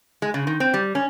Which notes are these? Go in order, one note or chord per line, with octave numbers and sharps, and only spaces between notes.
G#3
C#3
D#3
C4
G3
C#4